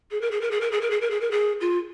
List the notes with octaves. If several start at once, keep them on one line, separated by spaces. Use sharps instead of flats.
G#4
A#4
G#4
A#4
G#4
A#4
G#4
A#4
G#4
A#4
G#4
A#4
G#4
F4